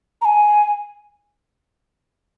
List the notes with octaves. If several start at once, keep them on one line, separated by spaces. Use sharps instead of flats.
A#5
G#5